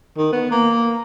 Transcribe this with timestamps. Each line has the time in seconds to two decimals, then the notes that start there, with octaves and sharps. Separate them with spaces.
0.18 D#3
0.32 B3
0.51 A#3